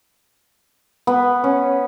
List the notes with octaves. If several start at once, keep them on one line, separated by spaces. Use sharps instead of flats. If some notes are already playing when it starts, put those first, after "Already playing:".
B3
C#4